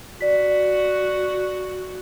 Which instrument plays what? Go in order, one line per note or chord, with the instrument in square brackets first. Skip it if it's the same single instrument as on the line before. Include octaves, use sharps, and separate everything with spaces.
[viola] F#4 [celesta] D5 B6